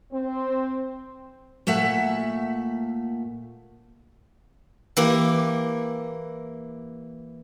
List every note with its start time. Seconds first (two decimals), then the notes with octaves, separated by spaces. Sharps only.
0.12 C4
1.67 A#2 A3 E5 F#5
4.97 E3 A#3 G4